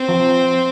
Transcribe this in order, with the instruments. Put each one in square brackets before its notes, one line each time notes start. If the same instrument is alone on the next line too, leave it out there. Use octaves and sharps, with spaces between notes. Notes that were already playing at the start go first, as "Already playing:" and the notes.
Already playing: [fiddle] C4
[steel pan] F3